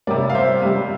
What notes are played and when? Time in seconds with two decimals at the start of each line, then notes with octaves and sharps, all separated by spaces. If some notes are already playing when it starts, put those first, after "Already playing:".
0.07 C3 G3 A#4 D5
0.30 F5
0.35 C5 E5
0.62 C3 G3